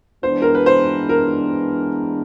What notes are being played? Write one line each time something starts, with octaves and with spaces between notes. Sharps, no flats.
E3 G#3 B3 D4 C5
A#4
B4
C5
A#4